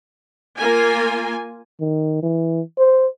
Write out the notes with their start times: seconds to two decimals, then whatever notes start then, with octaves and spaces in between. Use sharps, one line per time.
0.58 A#3 F4 G#5
1.81 D#3
2.23 E3
2.78 C5